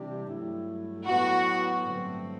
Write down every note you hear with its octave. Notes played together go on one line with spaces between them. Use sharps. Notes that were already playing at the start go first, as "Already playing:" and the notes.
Already playing: C3 E3 G3 D4 G4
G2 F#3 A3 E4
A2 F#3 B3 F#4
G2 D3 F#3 A3 C4